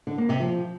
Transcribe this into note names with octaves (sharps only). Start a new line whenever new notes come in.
D3
A#3
C3
F3